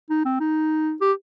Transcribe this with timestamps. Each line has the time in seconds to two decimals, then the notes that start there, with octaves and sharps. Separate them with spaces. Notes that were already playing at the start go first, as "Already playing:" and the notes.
0.10 D#4
0.25 C4
0.40 D#4
1.01 G4